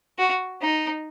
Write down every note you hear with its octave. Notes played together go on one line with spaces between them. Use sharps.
F#4
D#4